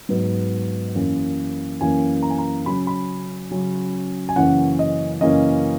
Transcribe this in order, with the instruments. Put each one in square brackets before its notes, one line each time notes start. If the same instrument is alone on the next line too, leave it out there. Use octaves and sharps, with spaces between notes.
[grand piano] G#2 F#3 B3
F#2 E3 A#3 C#4
F#2 E3 A#3 C#4 G#5
A#5
G#5
A#5
C#3 F#3 C#4 B5
B5
C#3 F#3 C#4
G#5
F#2 C#3 E3 A#3 C#4 F#5
D#5
F#2 C#3 E3 A#3 C#4 D#5